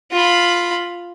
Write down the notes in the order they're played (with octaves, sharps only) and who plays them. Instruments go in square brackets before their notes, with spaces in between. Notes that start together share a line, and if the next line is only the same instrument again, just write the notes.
[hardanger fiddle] F4 B5